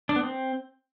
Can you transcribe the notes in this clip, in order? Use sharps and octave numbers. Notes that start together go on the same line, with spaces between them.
D4
B3
C4